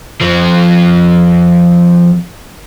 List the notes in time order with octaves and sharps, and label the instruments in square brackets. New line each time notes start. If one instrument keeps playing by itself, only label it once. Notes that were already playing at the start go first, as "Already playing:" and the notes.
[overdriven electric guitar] F3 C4